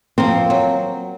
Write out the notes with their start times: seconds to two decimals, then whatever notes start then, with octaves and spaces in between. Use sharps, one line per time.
0.18 F3 A#3 C4 A#4
0.50 F#3